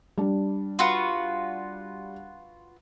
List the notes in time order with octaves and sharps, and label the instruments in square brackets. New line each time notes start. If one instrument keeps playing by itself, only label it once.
[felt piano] G3 D4
[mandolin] F4 F#4 B4